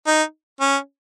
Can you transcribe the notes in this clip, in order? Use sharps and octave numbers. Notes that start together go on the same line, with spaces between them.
D#4
C#4